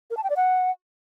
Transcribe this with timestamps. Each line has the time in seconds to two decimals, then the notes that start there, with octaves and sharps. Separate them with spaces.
0.10 A#4
0.17 A5
0.23 G5
0.30 D5
0.36 F#5